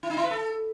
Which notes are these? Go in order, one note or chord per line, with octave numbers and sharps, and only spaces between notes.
E4
D#4
E4
B4
A4